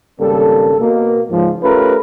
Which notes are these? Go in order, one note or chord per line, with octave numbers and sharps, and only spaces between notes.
G#1 C#3 G3 A#3 A4
B2 A#3
C#2 G#2 F3
A3 C#4 F4 G4 A#4 B4